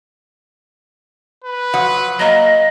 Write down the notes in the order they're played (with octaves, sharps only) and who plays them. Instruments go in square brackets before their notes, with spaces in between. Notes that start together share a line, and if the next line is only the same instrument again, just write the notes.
[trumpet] B4
[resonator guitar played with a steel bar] F3 F#3 F#5
[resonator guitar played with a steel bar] F#3 A#3 [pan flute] D#5